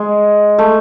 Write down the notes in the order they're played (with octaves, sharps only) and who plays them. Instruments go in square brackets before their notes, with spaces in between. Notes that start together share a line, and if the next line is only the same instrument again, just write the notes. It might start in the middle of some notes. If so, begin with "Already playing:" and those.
Already playing: [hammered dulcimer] G#3
A3